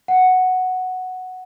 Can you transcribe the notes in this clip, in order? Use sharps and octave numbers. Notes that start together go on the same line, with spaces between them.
F#5